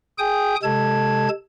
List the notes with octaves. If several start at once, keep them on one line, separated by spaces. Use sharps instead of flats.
G#4 G5 G#5 D#6 G6
C3 G#3 A4 A5 G#6